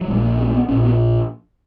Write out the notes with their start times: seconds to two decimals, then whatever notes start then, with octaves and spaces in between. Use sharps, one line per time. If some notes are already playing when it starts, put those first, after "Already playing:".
0.01 F#3
0.08 A#1 A#2 G#3
0.23 A#3
0.38 B3
0.47 A#3
0.54 B3
0.68 A#1 A#2 C#4
0.84 B3